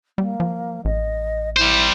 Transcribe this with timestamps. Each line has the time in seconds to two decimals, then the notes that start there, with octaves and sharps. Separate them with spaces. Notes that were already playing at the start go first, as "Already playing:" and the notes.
0.18 G3 A#3
0.40 F3
0.85 A1 D#5
1.57 G3 E4 C5